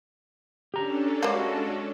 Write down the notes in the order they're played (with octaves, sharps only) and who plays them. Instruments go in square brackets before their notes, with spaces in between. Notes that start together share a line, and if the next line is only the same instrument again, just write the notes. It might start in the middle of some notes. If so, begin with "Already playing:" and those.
[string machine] C#4 D4 A4 [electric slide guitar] G4 A#5
[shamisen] G3 A#3 [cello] G#3 F#4